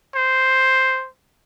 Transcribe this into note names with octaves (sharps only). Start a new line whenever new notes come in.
C5